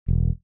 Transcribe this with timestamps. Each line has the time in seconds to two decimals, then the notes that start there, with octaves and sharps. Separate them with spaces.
0.08 E1